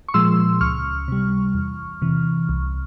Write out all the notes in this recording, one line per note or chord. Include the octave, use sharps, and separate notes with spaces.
C#6
A#2 F3 G#3 C6 E6
C#2 C#6 F6
C3 G3
E2
C3 E3
C2